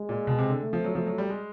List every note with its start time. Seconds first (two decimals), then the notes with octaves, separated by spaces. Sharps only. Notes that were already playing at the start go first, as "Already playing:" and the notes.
Already playing: G#3
0.09 A#2
0.27 B2
0.38 C3
0.49 D3
0.61 A3
0.73 F3
0.84 F#3
0.95 F3 A3
1.06 F#3
1.18 G3
1.30 G#3